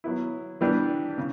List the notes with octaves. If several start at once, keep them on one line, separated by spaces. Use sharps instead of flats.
F#3 B3 E4
E3 G3 B3 D4
C#3